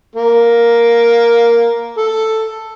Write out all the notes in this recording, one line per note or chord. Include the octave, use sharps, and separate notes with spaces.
A#3
A4